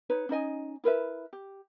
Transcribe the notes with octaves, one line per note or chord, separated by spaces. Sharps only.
D#4 B4 C#5
C#4 D#4 D#5 G#5
E4 A#4 B4 E5
G4